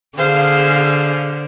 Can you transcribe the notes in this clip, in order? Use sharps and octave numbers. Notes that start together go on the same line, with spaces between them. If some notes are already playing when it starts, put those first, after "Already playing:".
D3 G#4 C5 F5